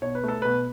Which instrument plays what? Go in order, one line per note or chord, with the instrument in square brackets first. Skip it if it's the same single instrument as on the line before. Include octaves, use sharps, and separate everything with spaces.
[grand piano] B2 C#5
B4
A3 A4
B2 B4